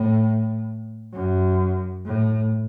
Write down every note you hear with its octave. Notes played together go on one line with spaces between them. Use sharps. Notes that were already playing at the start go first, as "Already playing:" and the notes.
Already playing: A2
F#2
A2